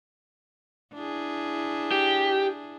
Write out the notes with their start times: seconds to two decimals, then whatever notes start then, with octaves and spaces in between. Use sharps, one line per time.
0.94 D4 E4 G#4
1.91 G4